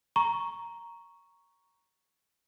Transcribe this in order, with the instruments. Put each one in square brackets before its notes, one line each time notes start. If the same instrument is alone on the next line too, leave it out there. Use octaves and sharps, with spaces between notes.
[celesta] A#5 C#6